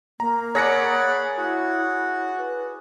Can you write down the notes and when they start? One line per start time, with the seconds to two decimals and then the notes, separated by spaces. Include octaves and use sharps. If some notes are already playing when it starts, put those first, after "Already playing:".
0.20 A#3 A#5
0.55 G#4 C#5 D5 F#5 B5 A#6 C#7
1.37 E4 F#4
2.38 B4